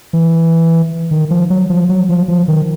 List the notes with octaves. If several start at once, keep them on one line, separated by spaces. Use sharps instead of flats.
E3
D#3
F3
F#3
F3
F#3
F3
F3
D#3